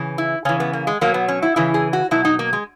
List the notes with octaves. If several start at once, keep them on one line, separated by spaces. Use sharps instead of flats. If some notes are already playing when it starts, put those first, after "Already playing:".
Already playing: C#3 E3
E4
C#3 E3 C#4
B3
A#3
G#3
B2 F#3 A#3
B3
C#4
E4
C#3 E3 E4
G#4
F#4
B2 F#3 E4
D#4
A#3
G#3